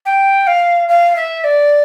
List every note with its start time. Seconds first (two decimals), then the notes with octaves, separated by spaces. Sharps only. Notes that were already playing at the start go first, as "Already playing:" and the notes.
0.06 G5
0.47 F5
0.88 F5
1.16 E5
1.44 D5